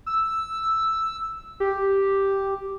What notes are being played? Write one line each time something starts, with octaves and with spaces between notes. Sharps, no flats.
E6
G4